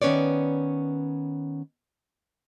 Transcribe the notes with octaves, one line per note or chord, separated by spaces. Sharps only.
D#3 B3 C#4 B4 C#5 D5